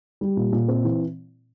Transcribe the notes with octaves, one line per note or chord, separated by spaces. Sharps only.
G3
A#2
A#2
C4
E3